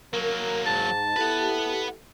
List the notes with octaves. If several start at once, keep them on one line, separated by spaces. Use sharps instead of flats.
F#3 A#3 A#4
G#2 A5
E4 G4 A4 B4 F#5